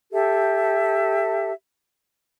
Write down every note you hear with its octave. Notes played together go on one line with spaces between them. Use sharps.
G4 A4 E5